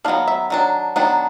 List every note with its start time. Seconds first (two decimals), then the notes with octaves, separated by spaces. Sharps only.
0.05 D#3 F#3 B3 D4 F5
0.28 E5
0.50 D#3 F#3 D4
0.96 D#3 F#3 B3 D4